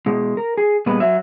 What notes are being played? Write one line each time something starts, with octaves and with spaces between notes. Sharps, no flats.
B2 G#3
A#4
G#4
A#2 G3 G#3 B3 B4
F#3 E5